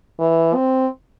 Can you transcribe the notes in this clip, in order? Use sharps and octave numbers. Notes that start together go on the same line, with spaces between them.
E3
C4